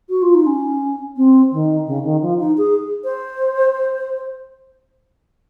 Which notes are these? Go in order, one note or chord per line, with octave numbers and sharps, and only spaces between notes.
F#4
F4
D#4
C#4
C4
D#3
C#3
D#3
F3
D#4
G#4
C5